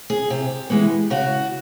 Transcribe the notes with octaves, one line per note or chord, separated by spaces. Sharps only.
G#4
C3 G4
E3 G#3 B3
C#3 F#4